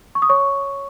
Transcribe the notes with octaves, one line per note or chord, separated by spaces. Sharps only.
C#6
D#6
C#5 C#6